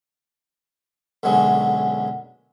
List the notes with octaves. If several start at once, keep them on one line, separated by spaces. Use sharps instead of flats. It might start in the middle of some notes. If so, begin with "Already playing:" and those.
B1 F#2 D3 F#3 G#3